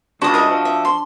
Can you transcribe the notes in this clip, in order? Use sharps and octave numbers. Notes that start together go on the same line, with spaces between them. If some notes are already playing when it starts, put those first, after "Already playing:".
C#2 D4 F#4 D#6
A#4 D#5 E5
F3
E5
C6